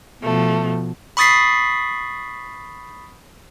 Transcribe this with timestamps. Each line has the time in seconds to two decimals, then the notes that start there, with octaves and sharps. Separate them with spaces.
0.23 B2 F3 A3
1.17 B5 C#6 D#6 A6 B6 C7